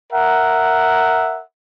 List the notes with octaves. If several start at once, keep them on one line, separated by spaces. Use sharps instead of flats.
A#4 E5 F#5